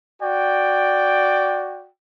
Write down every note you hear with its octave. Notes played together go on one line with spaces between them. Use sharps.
F#4 D5 G5